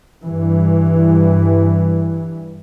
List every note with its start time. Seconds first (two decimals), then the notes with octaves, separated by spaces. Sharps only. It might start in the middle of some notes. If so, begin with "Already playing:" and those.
0.24 G2 E3